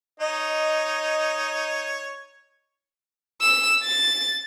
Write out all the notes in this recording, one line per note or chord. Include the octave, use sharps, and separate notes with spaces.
D#4 C#5 D#5
E6
A6